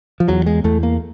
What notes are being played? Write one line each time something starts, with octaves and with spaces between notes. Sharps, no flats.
F3
E2 F#3
G#3
E2 A3
A#3